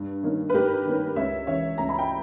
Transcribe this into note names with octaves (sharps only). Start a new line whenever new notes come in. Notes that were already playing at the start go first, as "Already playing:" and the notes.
Already playing: G2
D#3 A#3 C#4
B4
G2 G4 A#4
D#3 A#3 C#4
C#2 C#5 E5
C#3 E3 C#5 E5
C#2 A#5
B5
G5 A#5